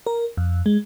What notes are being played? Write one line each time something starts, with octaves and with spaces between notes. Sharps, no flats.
A#4
F2
G#3